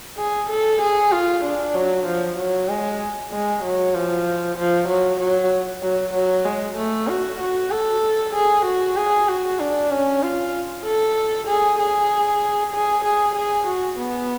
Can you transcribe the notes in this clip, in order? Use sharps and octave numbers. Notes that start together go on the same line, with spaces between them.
G#4
A4
G#4
F4
D4
F#3
F3
F#3
G#3
G#3
F#3
F3
F3
F#3
F#3
F#3
F#3
G#3
A3
F#4
F#4
A4
G#4
F#4
G#4
F#4
D4
C#4
F4
A4
G#4
G#4
G#4
G#4
G#4
F#4
B3